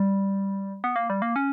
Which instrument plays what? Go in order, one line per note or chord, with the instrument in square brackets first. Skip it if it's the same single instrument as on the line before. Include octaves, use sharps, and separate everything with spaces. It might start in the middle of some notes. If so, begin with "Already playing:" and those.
Already playing: [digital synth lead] G3
B3
A#3
G3
A#3
C#4